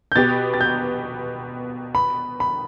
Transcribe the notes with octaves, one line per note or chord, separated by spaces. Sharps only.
G6
B2 B3 G4 A6
A6
G6
B5
B5